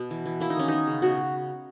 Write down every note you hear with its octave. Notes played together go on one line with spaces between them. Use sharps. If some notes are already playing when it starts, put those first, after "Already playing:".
Already playing: B2 B3
E3
E3
A#3 E4
D#4
D#3 C#4
B3 D#4
C#3
B2 F#4